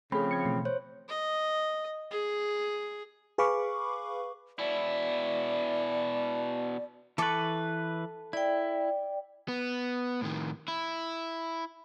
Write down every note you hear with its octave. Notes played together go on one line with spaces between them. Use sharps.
C#3 F3 A3 C4 G#4 B5
G#6 C#7
B2 E3 A3
C5 C#5
D#5
G#4
G#4 B4 F5 B5 C#6 D6
B2 E4 D5
E3 A4 B4 C#6 D6
E4 D5 G5
B3
A2 D#3
E4